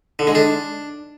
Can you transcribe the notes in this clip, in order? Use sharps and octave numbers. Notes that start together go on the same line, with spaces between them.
D3
G#3
D4